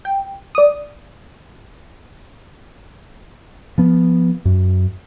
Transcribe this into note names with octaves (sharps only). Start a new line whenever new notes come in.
G5
D5 D#6
F3 B3
F#2